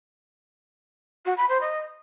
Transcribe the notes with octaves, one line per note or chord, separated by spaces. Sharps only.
F#4
B5
C5
D#5